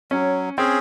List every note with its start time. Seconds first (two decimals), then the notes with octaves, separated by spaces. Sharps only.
0.11 F#3 C#4
0.58 C4 C#4 G#4